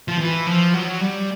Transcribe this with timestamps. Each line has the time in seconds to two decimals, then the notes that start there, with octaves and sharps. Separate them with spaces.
0.08 F3
0.19 E3
0.47 F3
0.74 F#3
1.01 G3